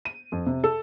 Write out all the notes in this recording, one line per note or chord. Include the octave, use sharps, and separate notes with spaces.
D#7
F2
C3
A4